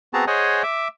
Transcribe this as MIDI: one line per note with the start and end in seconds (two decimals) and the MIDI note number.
0.14 0.25 59
0.14 0.25 60
0.14 0.25 66
0.14 0.25 68
0.14 0.25 81
0.14 0.25 82
0.27 0.63 68
0.27 0.63 72
0.27 0.63 73
0.27 0.63 75
0.27 0.63 78
0.27 0.63 80
0.63 0.88 76
0.63 0.88 86